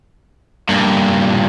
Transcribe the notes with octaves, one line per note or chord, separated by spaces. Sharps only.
G2 A#2